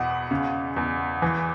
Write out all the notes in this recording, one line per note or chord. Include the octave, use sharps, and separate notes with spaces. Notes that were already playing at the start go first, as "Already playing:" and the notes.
Already playing: E2 B2 F#5
C#3
E2
E3